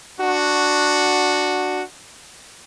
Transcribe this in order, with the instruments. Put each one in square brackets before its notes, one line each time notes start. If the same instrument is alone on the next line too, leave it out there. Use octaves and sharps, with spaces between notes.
[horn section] D4 F#4